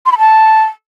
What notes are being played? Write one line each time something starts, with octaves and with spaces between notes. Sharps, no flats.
C6
B5
A5